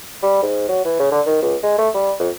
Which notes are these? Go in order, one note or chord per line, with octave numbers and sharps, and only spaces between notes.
G3
G#2
F#3
E3
C#3
D3
D#3
C#2
G#3
A3
G3
F2